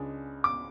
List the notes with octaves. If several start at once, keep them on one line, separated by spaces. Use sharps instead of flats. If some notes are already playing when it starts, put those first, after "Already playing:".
Already playing: C#2 C#3 G#3 D4
D6